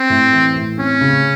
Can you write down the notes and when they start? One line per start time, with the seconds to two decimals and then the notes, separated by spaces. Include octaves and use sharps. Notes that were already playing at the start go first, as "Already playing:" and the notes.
Already playing: C4
0.10 A2
0.33 E3
0.55 A2
0.78 C4 C#4
1.01 C#3